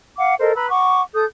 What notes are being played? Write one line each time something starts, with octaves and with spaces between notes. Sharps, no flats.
F5 F#5 D6
A4 A#4 C5 D#5
B4 A#5 B5 E6
F#5 C#6 D6
A4 D#6 G6